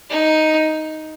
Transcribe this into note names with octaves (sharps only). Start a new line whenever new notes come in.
D#4